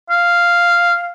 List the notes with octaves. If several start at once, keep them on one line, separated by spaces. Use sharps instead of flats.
F5